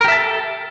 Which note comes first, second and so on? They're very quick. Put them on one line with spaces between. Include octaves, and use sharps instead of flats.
A#4 G4 E5 A5 A4